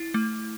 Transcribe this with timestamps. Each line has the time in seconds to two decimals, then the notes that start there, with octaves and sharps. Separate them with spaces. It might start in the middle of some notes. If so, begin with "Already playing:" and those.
Already playing: E4
0.14 A3